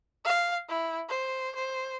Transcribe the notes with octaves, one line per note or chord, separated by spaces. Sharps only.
F5
E4
C5
C5